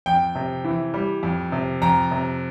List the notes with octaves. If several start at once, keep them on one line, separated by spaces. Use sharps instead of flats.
F2 G5
C3
E3
G3
F2
C3
F2 A#5
C3